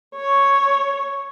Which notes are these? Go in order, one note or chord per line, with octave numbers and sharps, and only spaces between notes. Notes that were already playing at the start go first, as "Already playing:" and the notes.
C#5